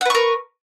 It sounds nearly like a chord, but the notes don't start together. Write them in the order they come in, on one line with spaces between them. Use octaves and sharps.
F#5 B4 C#6 A#4